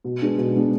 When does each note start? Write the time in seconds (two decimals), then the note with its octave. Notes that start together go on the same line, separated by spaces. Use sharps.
0.04 B2
0.21 G#3 B3 D4
0.38 B2
0.56 G#3 B3 D4